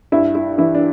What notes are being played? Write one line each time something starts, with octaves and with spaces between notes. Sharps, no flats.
G2 E4
E4
E3 E4
D4